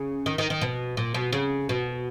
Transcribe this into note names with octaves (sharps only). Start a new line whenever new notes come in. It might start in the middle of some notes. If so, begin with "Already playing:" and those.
Already playing: C#3
D#3
D#3
D#3
B2
A#2
B2
C#3
B2